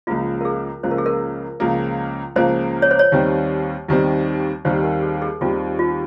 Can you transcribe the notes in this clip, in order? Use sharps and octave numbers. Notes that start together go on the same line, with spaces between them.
C#2 C#3 F3 A#3 F4
A#4
G#4
C#2 C#3 F3 A#3 C5
A#4
G#4
A#4
C#2 C#3 F3 A#3
C#2 C#3 F3 A#3 C5
C#5
C5
C#5
D#2 D#3 G3 C4
D#2 D#3 G3 C4
D#2 D#3 G3 C4 C5
A#4
G#4
G#4
D#2 D#3 G3 C4 F4
F4